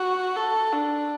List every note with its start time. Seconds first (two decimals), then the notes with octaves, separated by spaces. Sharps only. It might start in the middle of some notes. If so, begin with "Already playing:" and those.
Already playing: F#4
0.36 A4
0.73 D4